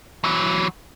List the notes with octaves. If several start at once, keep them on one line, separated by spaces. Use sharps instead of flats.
E3 F#3